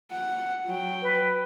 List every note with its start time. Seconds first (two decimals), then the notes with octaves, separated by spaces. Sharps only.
0.11 F#5
0.67 F#3 G5
1.02 B4